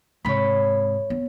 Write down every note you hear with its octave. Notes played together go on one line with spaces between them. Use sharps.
G#2 C3 C#5 B5
B3